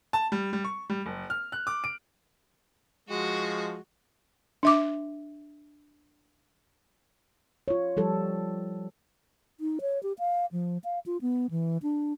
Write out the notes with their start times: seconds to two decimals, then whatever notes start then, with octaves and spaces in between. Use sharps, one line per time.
0.13 A5
0.32 G3
0.53 G3
0.64 C#6
0.90 G3
1.06 F#1
1.30 F6
1.52 F#6
1.67 D6
1.84 D7
3.09 F3 G#3 F#4
4.63 D4 E5 D6
7.68 F4 C#5
7.97 F3 G3 A4
9.60 D#4
9.81 C#5
10.03 G4
10.19 F5
10.52 F3
10.84 F5
11.06 F4
11.21 B3
11.51 E3
11.82 D4